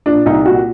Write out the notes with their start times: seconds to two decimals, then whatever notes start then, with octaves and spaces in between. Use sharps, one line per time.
0.06 A#2 D4
0.26 C2 D#4
0.45 A#2 F#4